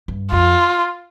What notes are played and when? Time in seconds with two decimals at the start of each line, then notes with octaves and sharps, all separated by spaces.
0.08 G2
0.32 F2 F4